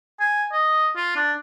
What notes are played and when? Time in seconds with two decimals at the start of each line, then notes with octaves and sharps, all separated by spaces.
0.20 G#5
0.53 D#5
0.96 F4
1.16 D4